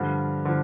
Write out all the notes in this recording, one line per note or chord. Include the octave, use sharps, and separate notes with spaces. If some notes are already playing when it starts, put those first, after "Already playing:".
Already playing: G2 D3 F3
D3 F3